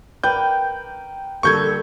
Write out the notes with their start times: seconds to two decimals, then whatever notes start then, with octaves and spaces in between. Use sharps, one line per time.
0.24 A#4 B4 G5 G6
1.43 D3 G3 A#3 A4 C#6 G6 G#6